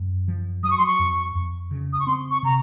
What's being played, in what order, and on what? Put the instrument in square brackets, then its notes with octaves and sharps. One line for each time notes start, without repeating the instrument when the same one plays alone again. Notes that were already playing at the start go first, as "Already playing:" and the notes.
Already playing: [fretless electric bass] F#2
F3
[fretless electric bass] F#3 [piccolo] D#6
[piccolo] C#6
C6
C#6
[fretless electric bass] F2
F2
C#3
[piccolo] D#6
C#6
[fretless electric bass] C4 [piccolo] C6
[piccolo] C#6
[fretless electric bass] C3 [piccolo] A#5